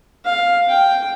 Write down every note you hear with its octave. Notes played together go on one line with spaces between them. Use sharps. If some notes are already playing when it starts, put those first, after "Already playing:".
F5
G5